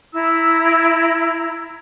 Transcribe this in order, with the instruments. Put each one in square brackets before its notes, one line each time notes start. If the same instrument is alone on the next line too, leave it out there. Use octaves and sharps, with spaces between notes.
[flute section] E4 A#5 E6